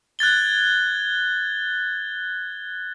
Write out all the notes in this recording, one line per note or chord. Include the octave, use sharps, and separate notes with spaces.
F#6 G#6 A6 G7